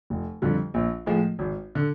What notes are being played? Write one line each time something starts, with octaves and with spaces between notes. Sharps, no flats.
F1
F2 D3 G3
A#1
A2 F3 G#3
G#1
D3